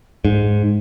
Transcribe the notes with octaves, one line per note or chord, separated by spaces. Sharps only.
G#2